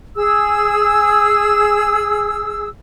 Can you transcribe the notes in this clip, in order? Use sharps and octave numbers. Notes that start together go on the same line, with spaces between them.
G#4 E6